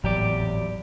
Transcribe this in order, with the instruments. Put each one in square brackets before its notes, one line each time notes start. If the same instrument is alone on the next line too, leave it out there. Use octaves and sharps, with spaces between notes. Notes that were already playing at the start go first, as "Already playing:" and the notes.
[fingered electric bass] G#1 A2 F#3 [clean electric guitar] E2 G4 D5